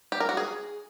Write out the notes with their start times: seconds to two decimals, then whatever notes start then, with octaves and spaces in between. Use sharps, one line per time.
0.12 G4
0.20 A#4
0.29 F#4
0.37 G#4